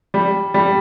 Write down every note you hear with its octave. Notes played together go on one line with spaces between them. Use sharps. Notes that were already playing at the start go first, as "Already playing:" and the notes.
G3
G3